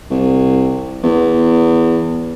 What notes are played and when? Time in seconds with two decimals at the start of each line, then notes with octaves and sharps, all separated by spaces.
0.10 C2
1.03 E2